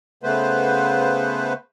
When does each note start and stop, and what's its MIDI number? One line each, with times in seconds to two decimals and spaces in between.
0.23 1.53 49
0.23 1.53 57
0.23 1.53 59
0.23 1.53 71
0.23 1.53 72